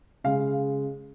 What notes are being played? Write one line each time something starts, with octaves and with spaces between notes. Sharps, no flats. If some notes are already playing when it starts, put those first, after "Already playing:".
C#3 G#3 F5